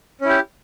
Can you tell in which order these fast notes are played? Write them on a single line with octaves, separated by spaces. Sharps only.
C#4 E4 G4